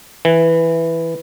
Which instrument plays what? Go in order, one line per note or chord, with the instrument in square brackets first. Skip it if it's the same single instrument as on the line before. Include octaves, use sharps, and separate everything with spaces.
[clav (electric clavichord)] E3